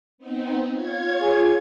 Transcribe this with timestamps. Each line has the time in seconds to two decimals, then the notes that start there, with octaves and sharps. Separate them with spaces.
0.18 B3 C4 D#4
0.73 F4 C#5 G#6
1.20 G#4